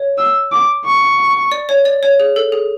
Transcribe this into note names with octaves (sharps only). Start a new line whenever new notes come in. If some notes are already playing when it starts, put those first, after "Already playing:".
Already playing: C#5
E6
D6
C#6
D5
C#5
D5
C#5
G#4
A4
G#4